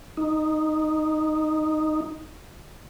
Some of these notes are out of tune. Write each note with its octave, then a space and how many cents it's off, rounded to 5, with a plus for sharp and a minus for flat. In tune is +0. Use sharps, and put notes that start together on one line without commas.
D#4 -5